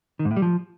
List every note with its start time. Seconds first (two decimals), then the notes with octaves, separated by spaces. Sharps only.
0.19 D#3
0.25 G#2
0.31 A2
0.36 G3
0.42 F3